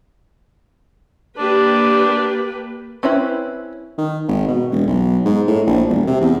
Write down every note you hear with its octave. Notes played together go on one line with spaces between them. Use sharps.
A#3 D4 G4 B4
C4 C#4 E4 B4
D#3
G#1
B2
E1
B1
G#2
A2
A#1
E1
C3
E2